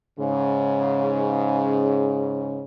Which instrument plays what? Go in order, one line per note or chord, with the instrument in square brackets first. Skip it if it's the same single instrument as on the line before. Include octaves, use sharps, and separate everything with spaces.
[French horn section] G#2 C#3